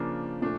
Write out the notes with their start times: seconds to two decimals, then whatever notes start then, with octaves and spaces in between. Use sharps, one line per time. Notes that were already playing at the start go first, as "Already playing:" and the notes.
Already playing: C#3 F3 A#3 D4
0.42 A#2 F3 A3 D4